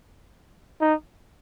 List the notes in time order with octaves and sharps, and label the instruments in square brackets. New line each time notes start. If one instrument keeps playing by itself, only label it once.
[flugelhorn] D#4